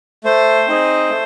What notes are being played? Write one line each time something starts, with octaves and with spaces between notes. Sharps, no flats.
A3 C5
C4 D#4 G#4
A3